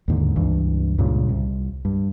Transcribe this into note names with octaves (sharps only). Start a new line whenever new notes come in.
D#2 G#2 D3
C#2 G2 E3
C#2 G2 A#2 C#3
C2
G2